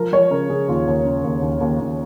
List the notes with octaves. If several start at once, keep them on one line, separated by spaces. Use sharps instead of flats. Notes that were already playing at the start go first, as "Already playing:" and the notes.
Already playing: F3 A#4
F3 C#5
C#3 A#4
C#3 G#4
D#2 F4
D#2
C#3
D#2
D#2
D#2
D#2